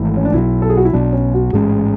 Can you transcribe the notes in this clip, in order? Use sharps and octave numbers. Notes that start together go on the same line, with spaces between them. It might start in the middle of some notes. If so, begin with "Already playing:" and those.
Already playing: G#1 G#2 E3 A3 E4
C#4
D4
B1 B2 F#3 E4
A4
G#4
F#4
E4
B1 B2 F#3 D4
C#4
F#4
A1 G#2 G#3 C#4 G#4